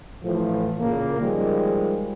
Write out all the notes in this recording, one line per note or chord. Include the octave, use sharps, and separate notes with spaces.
A2 E3 F3
A#2 C#3 A#3
D#3 F3 G3 G#3